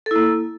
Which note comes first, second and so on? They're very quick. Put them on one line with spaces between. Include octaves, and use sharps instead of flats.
A4 E4 A#3